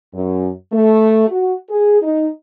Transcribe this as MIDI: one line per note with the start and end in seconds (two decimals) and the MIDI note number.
0.13 0.48 42
0.71 1.28 57
1.28 1.53 66
1.69 2.00 68
2.02 2.27 63